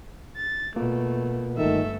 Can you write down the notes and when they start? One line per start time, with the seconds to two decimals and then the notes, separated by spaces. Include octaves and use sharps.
0.37 A6
0.76 B2 A3 A#3 F4 A#4
1.58 G1 D#3 A3 A4 E5